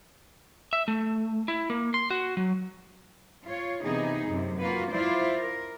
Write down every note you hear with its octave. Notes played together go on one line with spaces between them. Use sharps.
E5
A3
E4
A#3
C6
F#4
F#3
F4 C#5
C3 E3 B3 D#4 G#4
F#2 A2 C3
A#3 F4 F#4 B4
E4 F4 C5 D5
A#4